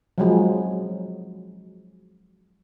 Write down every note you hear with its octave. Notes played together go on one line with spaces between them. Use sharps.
F3 F#3 G#3